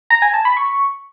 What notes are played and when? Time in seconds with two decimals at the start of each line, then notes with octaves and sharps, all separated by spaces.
0.10 A#5
0.22 G#5
0.34 A5
0.45 B5
0.57 C#6